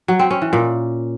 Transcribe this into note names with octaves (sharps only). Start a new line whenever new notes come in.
F#3
C4
C#4
E3
A#2